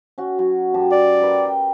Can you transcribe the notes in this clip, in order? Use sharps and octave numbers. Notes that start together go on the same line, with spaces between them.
C#4 F#4
F#3 C#6
F#2 G4 A5
D5
A#4 B4 G5
G5